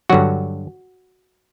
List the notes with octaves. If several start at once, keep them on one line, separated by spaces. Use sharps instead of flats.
G2 D3 F#3 F#4